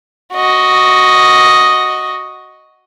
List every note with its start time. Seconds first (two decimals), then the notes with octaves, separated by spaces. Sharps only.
0.34 F#4 D#5